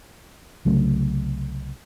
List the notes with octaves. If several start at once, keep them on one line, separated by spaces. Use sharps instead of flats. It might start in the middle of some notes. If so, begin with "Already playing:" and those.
C2 C#3 F#3 A3